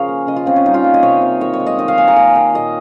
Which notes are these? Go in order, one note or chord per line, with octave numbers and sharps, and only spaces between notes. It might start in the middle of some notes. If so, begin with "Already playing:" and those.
Already playing: C#3 F3 G#4 A#4 C#5 F5
A#3
C#3 D#5
F4
C#3 C4
C#4
G3 D#4
F4
A#3
D#5
C3 C#5
C3
D#3 C#5
C#5
G#3
D#5
D#3 D#5
F5
A#3 G#5
A#5
A#3 G#5
D#3 G5
A#2 D#5